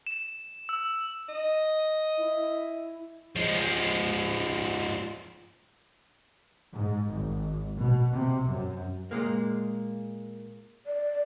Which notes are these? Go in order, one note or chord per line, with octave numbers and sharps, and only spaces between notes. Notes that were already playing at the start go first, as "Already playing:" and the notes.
E7
E6
D#5
E4
F3 G#3
G#2
G#1
B2
C3
F#2
A#2 G#3 A#3
D5